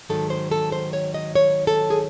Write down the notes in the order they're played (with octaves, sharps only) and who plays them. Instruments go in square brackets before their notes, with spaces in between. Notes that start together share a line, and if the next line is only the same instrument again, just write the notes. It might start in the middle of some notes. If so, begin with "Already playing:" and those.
[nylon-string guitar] G#2 D#3 F#3 A4
C5
A4
C5
C#5
D#5
C#5
A4
G#4